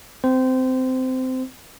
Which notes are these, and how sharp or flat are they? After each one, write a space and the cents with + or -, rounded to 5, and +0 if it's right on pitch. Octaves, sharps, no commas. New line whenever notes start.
C4 -20 C5 -20